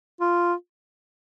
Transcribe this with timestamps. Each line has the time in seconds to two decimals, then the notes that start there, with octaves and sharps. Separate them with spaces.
0.20 F4